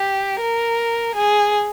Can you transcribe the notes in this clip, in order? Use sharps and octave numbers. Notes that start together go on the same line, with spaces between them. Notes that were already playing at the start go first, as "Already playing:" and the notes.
Already playing: G4
A#4
G#4